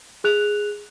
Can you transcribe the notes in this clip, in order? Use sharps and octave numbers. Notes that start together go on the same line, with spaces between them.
G#4 F#6 F7